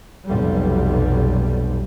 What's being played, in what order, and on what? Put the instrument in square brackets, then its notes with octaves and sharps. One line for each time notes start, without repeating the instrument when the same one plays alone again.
[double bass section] F1 B1 G3